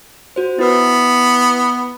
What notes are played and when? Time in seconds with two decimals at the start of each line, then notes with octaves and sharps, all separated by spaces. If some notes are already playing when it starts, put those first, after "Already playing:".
0.36 F#4 C5
0.59 B3 E4 B4 E6